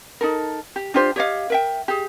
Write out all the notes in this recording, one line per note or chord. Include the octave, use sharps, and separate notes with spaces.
D#4 A4 A#4
G4
D4 F4 G4 C5
G4 C#5 D#5 F5
A#4 E5 G5
G4 G#4